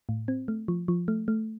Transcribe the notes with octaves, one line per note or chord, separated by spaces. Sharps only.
A2
C4
A3
F3
F3
A3
A3